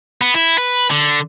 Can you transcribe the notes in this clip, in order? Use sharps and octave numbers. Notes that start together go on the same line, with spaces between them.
B3
E4
B4
D3